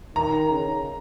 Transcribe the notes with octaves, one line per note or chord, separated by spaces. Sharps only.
D#3 A#5
C#3